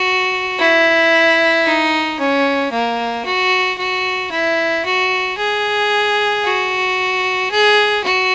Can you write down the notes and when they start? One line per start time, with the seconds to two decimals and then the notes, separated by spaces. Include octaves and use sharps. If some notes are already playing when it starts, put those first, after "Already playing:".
Already playing: F#4
0.59 E4
1.65 D#4
2.19 C#4
2.72 A#3
3.25 F#4
3.78 F#4
4.31 E4
4.85 F#4
5.38 G#4
6.44 F#4
7.51 G#4
8.04 F#4